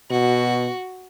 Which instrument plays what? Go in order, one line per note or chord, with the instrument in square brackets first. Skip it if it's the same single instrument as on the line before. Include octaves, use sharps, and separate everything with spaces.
[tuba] B2 [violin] F#4